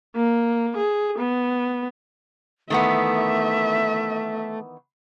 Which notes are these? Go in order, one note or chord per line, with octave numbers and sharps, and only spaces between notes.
A#3
G#4
B3
D#3 E3 A3 B3 E5